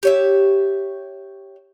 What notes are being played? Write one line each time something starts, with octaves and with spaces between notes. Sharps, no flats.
G4 C#5 E5